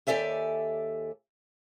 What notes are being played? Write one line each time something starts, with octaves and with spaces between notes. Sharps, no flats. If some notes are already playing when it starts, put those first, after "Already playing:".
D#2 G4 A4 D5 E5 G#5